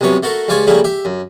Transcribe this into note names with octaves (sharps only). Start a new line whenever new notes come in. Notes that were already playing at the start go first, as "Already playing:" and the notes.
C2 F#2 C3 B3 C#5
A3 F#4 A4 A#4
C#2 G3 F4 D5 G#5 C#6
C#3 F3 G3 A3 A#3 E4
G4 E5
F#2